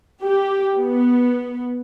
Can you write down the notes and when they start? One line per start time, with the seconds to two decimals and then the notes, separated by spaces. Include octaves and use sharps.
0.22 G4
0.77 B3